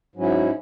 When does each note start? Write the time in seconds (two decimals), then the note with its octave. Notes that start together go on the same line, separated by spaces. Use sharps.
0.15 G#2 F#3 C#4 E4